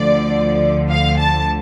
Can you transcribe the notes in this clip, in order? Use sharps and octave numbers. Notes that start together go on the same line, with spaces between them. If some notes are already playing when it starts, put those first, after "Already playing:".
Already playing: D2 D3 F3 D5
F5
A5